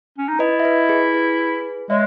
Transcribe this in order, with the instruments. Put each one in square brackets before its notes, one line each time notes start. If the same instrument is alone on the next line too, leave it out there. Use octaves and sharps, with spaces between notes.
[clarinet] C#4
D#4
[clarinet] E4 [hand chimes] B4 D#5
[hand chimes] E5
B4 D#5
G#4 B4
G#4 B4
[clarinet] G#3 [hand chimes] C#5 E5